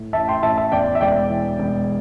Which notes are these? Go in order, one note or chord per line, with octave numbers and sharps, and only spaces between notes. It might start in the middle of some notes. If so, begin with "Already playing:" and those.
Already playing: A2
A1 E5 A5
G5 C6
A1 E5 A5
E5 A5
E2 D5 G5
E5
E1 D5 G5
E3
E1